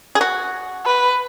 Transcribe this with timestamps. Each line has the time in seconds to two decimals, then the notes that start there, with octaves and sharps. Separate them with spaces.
0.15 G#4
0.21 F#4
0.86 B4